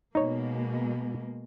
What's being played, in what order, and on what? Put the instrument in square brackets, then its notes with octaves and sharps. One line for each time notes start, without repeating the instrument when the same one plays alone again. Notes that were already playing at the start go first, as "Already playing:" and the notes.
[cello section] B2 G#3 A#3 [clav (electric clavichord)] D#4 C#5